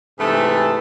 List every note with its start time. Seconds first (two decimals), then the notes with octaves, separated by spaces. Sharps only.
0.19 G#2 C3 E3 A3 B3 A5